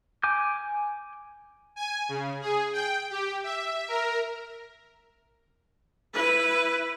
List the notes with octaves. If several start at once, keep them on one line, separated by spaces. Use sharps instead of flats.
G#5 D6 G6
G#5
C#3
G#4
G5
G4
E5
A#4
E4 B4